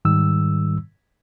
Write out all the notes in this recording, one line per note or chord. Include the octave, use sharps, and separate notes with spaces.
G#2 D#3 G3 E6